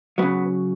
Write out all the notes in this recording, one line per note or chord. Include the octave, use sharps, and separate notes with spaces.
C#3 F#3 B3